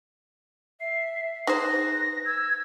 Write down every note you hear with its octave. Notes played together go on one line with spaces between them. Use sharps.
E5 C7
D#4 G#4 B4 C5 A#6
E6 G#6